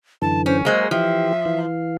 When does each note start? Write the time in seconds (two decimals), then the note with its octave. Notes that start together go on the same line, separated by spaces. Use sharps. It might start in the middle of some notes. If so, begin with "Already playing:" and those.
0.22 F#2 D3 E3 A5
0.46 C#4 C5
0.65 F#3 G#3 A#3 G#4 C5
0.91 E3 F3 G4 E5
1.45 E3 F5